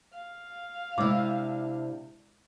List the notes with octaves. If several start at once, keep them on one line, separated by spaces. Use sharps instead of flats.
F5
C3 G#3 D4 E4